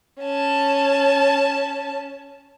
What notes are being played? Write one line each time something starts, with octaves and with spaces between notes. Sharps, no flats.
C#4 A5